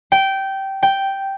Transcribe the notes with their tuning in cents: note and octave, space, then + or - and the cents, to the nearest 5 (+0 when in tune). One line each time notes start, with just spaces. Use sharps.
G5 -15
G5 -5